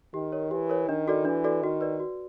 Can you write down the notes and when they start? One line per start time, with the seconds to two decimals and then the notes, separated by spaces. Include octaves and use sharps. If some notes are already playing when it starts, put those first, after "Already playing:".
0.14 D#3 G4
0.32 A#4 C#5
0.51 E3 G4
0.69 A#4 C#5
0.88 D#3 D4
1.08 F#4 A4 D5
1.25 E3 D4
1.44 F#4 A4 D5
1.62 D#3 F#4
1.81 B4 D5
2.00 F#4